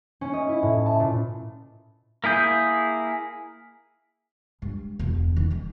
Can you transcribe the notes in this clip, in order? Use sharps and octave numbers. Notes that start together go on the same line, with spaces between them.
C#4
D#5
E4
A2
A5
A#2
A#3 E4 G#4 G6
G2 G#3
E1 D2
D#3
D#3 G#3